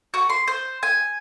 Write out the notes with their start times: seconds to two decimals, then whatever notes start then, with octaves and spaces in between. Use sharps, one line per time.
0.14 F#4
0.29 C6
0.48 C5
0.83 G#5